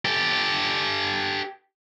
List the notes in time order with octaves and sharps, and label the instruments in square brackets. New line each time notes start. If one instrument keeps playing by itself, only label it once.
[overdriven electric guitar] G4 A4